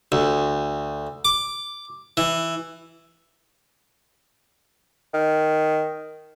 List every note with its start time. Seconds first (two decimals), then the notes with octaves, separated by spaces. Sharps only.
0.12 D2
1.25 D6
2.17 E3
5.14 D#3